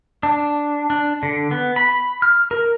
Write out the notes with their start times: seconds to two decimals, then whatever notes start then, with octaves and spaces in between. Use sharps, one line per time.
0.23 D4
0.90 D4
1.23 D3
1.51 B3
1.76 B5
2.22 F6
2.51 A#4